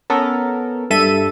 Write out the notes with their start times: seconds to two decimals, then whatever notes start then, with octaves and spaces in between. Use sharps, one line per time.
0.10 B3 C#4 A4 A#4
0.90 G2 A4 E5 D#7